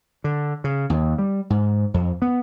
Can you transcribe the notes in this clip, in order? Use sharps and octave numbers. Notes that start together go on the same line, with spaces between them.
D3
C#3
D#2
G3
G#2
F2
B3